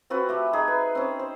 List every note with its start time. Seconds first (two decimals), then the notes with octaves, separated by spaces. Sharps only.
0.10 C4 F4 F#4 B4
0.29 A3 G4 E5
0.53 D#4 G#4 E5
0.68 B4
0.95 C4 C#4
1.19 C5